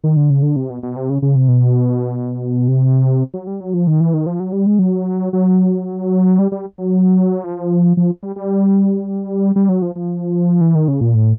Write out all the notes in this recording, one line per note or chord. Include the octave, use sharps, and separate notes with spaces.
D#3
D3
C#3
D3
C3
B2
B2
C3
C#3
C#3
C3
B2
C3
F#3
G3
F#3
F3
D#3
E3
D#3
F3
F#3
G3
G#3
F#3
F#3
G3
G3
F#3
F3
F3
G3
G3
G3
F#3
F3
F3
E3
D#3
C#3
A#2
A2